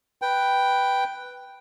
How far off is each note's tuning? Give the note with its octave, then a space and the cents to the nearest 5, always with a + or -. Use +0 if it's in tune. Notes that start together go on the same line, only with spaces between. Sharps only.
B4 +0 G5 +0